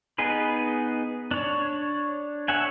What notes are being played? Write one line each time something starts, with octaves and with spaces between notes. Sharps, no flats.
B3 D#4 G#4 B4
D4 C#5
A4 C#5 E5 F#5 G#5